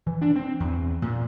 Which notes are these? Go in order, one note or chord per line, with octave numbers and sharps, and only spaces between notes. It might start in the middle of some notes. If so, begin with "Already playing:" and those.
E3
D4
C4
E2
A#2